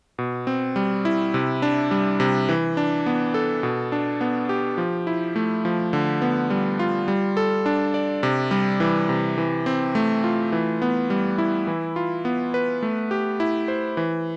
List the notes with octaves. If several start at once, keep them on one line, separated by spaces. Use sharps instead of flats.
B2
C4
G3
E4
C3
D4
G3
C3
E3
D4
B3
A4
B2
D4
B3
G4
F3
E4
A3
F3
D3
B3
G3
F4
G3
A4
D4
D5
C3
G3
E3
C3
E3
C4
A3
F4
E3
B3
G3
E4
E3
F4
B3
B4
A3
G4
E4
C5
E3